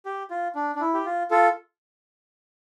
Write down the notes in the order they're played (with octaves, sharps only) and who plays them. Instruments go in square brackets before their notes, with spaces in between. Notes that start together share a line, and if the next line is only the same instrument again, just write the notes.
[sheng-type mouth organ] G4
F4
D4
D4
E4
G4
F4
F4 A4